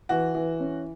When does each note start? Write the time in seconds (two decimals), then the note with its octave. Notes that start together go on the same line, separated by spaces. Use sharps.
0.09 E3 F#4
0.35 E3
0.60 C#4